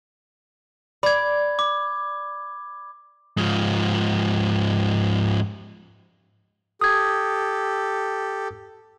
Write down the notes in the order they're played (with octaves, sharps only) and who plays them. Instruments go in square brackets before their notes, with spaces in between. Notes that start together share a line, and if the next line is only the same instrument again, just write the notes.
[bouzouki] D5 [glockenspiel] B5 G#6
[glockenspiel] D6
[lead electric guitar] G#2 F3
[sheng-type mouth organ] G4 A4 [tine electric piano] D#6 G#6